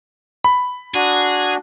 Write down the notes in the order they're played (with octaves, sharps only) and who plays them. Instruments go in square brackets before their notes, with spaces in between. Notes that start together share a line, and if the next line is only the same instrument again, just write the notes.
[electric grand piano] B5
[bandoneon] D4 F#4 [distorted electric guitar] G#4